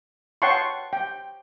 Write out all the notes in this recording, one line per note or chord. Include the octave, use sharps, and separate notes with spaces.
C#5 F#5 G5 A5 C6 C#6
G5